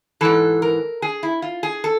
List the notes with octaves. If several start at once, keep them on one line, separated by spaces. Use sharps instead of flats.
G#2 E3 A4
A#4
G#4
E4
F4
G#4
A4